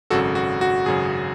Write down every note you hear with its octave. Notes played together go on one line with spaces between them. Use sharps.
G#1 F#2 C#3 F#4 A4
F#4
F#4
G#1 F#2 C#3 G#4